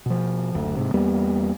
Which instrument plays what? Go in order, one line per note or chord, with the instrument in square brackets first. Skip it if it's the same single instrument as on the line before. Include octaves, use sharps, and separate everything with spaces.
[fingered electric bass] B2 F3
F#1 D2
G#2 C3
E2 G3 A#3 B3